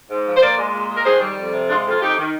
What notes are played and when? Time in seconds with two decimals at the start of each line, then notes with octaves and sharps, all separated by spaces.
0.09 G#2
0.26 F3
0.36 C5
0.41 A#2 A#4 D5
0.57 G#3
0.73 A#2
0.90 G#3 A#4
1.05 D#3 G#4 C5
1.21 G3
1.38 F2
1.53 C3
1.69 G#3 D4 F4
1.85 F2
1.90 F4
2.01 F2 D#4 G4
2.18 D#3